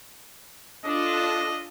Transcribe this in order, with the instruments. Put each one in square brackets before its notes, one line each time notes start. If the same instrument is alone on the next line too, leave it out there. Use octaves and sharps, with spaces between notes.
[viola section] D4 F4 A4 [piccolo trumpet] D#5